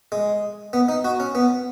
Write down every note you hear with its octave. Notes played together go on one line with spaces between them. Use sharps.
G#3
B3
D#4
F#4
C#4
B3